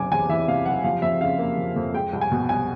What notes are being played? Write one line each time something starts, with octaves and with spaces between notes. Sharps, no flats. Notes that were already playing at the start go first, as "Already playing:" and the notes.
Already playing: F#1 B1 C3 G#5 D6
E2 G#5
E3 E5
C3 F5
F#1 F#5
F3 F5
F2 E5
C#3 F5
A#3
F3
F2
G#3 G5
C2
G#5
B2
C2 G#5